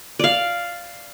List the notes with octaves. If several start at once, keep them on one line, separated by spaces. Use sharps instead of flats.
D5 F5